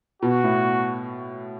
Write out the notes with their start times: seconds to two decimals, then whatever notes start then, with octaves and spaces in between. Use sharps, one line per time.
0.22 B2 F#4
0.44 A2